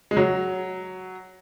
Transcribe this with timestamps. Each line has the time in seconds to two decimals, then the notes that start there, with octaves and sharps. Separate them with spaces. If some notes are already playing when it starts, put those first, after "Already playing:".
0.11 G#3
0.17 F#3